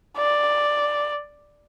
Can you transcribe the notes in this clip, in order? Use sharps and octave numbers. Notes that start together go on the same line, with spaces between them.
D5